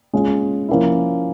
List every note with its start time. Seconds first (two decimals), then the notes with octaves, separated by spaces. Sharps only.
0.13 G#3 C#4 F4
0.68 F3 A#3 C#4 E4